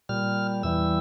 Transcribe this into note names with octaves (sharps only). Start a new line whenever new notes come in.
A#2 G3 F6
E2 E3 G3 E6